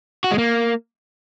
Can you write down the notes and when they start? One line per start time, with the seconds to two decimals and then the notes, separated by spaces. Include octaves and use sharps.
0.24 F#4
0.31 G#3
0.38 A#3